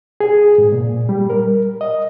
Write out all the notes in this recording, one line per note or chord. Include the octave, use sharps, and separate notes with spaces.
G#4
G#2
A#2
G3
A#4
D#5